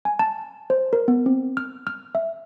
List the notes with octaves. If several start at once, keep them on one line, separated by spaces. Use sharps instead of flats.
G#5
A5
C5
A#4
B3
C4
F6
F6
E5